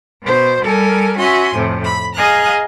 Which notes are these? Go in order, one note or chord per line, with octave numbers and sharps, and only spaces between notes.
B2 C5
G3 A4 A#4 G#5
C#4 F#4 E5 G#5 C6
F2 A2 C3
B5
G#4 D#5 F5 G#5 A#5 F#6